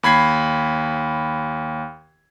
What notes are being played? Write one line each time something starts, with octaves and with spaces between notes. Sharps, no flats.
D#2 B5 G#6 C7